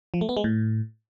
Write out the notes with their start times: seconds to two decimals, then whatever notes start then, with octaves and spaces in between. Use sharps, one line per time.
0.14 F3
0.21 A3
0.29 B3
0.37 G#3
0.44 A2